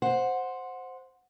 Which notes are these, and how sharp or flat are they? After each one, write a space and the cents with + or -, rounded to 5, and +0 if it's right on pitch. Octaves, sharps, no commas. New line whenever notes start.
C5 +0 F#5 -15